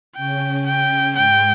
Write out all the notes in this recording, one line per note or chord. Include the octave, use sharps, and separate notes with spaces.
C#3 C#4 G5
C#3 C#4 G5
G#2 G#3 G5